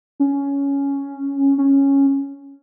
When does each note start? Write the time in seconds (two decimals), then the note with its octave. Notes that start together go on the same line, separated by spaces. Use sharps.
0.20 C#4
1.58 C#4